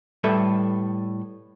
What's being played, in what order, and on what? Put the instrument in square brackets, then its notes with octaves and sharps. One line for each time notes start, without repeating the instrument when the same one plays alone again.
[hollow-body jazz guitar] A2 G3 A4 B4 C#5 E5